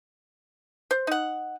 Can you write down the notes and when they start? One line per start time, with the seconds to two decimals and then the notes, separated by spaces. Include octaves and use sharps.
0.91 C5
1.07 D#4 F#5